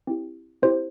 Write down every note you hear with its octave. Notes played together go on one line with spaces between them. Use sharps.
C4 E4 G4
C4 E4 G4 C5